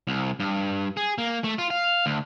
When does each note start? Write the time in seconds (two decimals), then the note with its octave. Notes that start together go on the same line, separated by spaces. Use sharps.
0.07 C2
0.40 G2
0.97 G#4
1.18 A#3
1.44 A3
1.58 F4
1.70 F5
2.06 D2